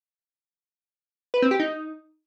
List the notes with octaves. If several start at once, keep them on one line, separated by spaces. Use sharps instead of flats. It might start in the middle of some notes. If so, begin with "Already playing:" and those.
B4
C4
G4
D#4